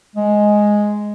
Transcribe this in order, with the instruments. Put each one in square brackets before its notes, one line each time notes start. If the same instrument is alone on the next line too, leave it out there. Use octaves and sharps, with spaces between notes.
[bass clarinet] G#3